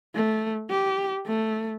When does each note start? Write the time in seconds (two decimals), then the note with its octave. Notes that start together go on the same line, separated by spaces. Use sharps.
0.15 A3
0.70 G4
1.27 A3